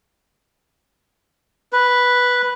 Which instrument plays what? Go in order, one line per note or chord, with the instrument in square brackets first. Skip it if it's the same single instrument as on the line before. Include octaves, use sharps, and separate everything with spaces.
[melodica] B4